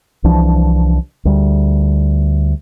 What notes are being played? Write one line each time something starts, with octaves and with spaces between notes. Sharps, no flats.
C2 E3 F3 D4
D2 G3